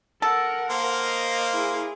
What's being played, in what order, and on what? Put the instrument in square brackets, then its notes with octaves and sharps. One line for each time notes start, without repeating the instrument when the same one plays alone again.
[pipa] A4 [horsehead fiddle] A#4 F#5
[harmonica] A#3 C5 F5
[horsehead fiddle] D#5
E4 G#4